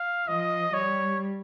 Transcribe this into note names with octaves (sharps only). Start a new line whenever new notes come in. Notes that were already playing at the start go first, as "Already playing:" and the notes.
Already playing: F5
F3 D#5
G3 C#5